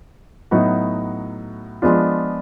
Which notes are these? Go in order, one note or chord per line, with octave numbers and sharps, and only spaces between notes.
A2 F#3 B3 D#4 F#4
F3 G#3 B3 D4 F4